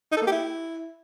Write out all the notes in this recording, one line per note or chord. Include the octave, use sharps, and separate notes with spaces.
D#4
A4
A#3
G4
E4